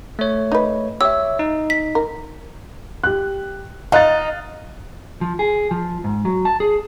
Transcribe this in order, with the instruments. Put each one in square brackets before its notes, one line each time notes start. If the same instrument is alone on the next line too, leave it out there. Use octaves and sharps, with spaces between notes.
[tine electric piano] A3 C#5
[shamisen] D#4 B4
[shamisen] G4 [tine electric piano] C#5 E5 [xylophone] E6
[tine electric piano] D#4
[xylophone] B6
[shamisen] A#4
[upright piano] G4 F#6
[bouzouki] D#4 [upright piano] F5 F#6 A6
[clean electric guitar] F3
G#4
F3
G#2
F#3
A5
G#4